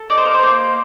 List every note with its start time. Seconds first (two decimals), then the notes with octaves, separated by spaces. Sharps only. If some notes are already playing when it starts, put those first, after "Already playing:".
Already playing: A4
0.10 D#4 D5
0.17 C5
0.25 A#4
0.34 C5
0.43 A#3